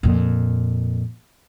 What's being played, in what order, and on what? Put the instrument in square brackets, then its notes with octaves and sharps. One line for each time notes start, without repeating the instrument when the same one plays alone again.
[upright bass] F2 A#2